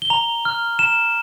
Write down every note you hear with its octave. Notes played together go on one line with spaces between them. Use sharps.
G7
A#5 F7
F6
A#5 E7